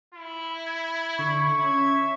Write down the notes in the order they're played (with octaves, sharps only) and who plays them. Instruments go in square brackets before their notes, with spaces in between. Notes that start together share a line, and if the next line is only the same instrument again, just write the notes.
[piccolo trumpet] E4
[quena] G#6
[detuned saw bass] D3 [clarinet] C#6
[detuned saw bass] C#4 [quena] E5 [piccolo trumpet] G#6